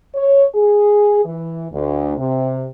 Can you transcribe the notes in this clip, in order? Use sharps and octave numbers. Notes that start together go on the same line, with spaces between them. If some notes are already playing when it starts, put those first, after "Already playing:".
C#5
G#4
E3
D2
C3